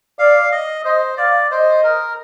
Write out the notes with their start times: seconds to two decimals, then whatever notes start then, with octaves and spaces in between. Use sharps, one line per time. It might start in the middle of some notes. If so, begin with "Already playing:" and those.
0.19 D5 F5
0.52 D#5
0.84 C5 D#5
1.17 D5 F5
1.51 C5 D#5
1.84 A#4